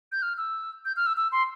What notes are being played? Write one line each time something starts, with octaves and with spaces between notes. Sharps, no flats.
G6
F6
E6
G6
F6
E6
E6
C6